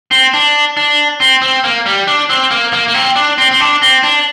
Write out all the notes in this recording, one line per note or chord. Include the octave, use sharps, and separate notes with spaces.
C4
D4
D4
C4
C4
A#3
G3
D4
C4
A#3
A#3
A#3
C4
D4
C4
C4
D4
C4
D4